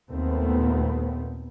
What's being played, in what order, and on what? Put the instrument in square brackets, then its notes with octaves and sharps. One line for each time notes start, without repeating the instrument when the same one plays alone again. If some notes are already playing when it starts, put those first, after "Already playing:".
[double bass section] D#2 A#2 A3 B3 C4